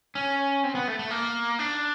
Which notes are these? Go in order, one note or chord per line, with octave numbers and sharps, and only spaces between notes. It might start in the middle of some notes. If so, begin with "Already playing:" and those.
C#4
C4
B3
A3
A3
A#3
D4